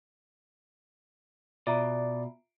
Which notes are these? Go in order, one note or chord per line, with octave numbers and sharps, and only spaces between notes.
B2 F4 D5 E5 A#5